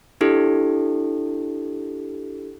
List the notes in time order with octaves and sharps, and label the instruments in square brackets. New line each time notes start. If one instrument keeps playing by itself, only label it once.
[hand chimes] D4 E4 G4 A4